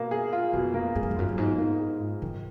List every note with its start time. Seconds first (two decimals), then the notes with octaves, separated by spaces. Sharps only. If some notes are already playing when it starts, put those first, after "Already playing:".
Already playing: B2 A#3
0.11 G#4
0.33 F4
0.53 F2 B2
0.74 A#3
0.95 G#2 G#4
1.03 F#2
1.11 F2
1.16 F#2 F4
1.29 F#2
1.37 G#2 B2
1.58 A#3
1.80 G#4
2.00 F4
2.22 F2 D#3